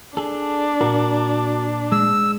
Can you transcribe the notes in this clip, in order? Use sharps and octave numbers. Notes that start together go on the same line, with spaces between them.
D4 G#4 A4
A#2 F#4 A#4
G#3 E6